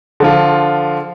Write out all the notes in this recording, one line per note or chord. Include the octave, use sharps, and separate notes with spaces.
D3 F3 F4